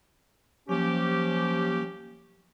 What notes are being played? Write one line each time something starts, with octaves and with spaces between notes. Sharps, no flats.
F3 F#3 A#3 C#4 G4